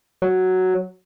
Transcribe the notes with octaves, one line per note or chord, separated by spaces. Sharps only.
F#3